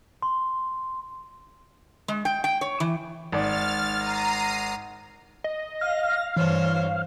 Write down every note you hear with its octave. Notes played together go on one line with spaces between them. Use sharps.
C6
G#3
G5
G5
C#5
E3
G#1 D5 F6 A6
A#5 C7 D#7
D#5
F5 A#6
G2 E3 C5 C#5